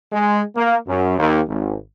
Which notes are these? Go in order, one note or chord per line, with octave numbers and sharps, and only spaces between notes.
G#3
A#3
F#2
D#2
G#1